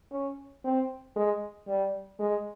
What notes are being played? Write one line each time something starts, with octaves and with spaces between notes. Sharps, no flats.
C#4
C4
G#3
G3
G#3